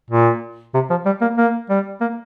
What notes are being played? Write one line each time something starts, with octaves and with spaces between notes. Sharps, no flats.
A#2
C3
F3
G3
A#3
A#3
G3
A#3